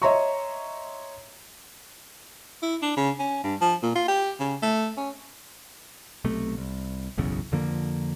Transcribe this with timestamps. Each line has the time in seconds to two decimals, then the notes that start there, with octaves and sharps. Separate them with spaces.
0.02 C#5 D#5 E5 A#5 C6 C#6
2.62 E4
2.82 D4
2.97 C#3
3.19 C#4
3.44 G2
3.61 F3
3.83 A#2
3.96 F4
4.08 G4
4.40 C#3
4.62 A3
4.97 C#4
6.25 B1 C3 A3
6.57 C2
7.18 F#1 B1 E2 C#3
7.52 F2 D3 F3 A#3